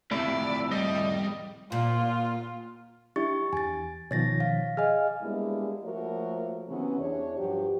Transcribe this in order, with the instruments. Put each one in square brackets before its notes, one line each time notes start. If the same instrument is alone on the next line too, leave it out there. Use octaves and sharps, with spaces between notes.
[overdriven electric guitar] A2 C3 [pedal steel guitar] E4 [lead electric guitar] D5
[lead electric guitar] G3 [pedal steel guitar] D#5
[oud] A#2 [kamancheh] F4
[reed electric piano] D4 E4 [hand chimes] G4 C#6 A6
[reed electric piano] E2 [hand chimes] G#5 A6
[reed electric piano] B2 D#3 F3 [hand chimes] C#5 A6 A#6
[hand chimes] F5
[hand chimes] G#4 D#5 [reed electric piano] F5 G#5 F6
[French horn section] G3 G#3 A#3 B3 D4 E4
F3 A3 A#3 F#4 A#4 C#5
C3 E3 F#3 B3 C#4
E2 D4 C#5
G2 F3 F#3 G4